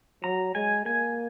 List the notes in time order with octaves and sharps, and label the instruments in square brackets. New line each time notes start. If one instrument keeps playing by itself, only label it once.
[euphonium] F#3 [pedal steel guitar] A#5
[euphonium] G#3 [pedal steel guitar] G#5
[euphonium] A#3 [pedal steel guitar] G#5